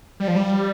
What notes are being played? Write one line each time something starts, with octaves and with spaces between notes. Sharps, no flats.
G3
F3
G3